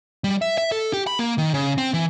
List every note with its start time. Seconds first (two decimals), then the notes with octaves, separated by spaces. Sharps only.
0.24 G3
0.42 E5
0.58 E5
0.72 A4
0.93 G4
1.07 B5
1.19 A#3
1.38 D#3
1.54 C#3
1.78 C4
1.94 E3